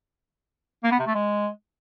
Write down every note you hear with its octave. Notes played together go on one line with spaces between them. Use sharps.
A#3
B3
C3
A3
G#3